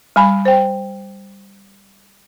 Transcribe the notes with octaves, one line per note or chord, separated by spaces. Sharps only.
G3 G#5 B5
C5 G5